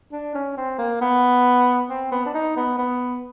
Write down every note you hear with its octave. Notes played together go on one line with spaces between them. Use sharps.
D4
C#4
C4
A#3
B3
C4
B3
D4
D#4
B3
B3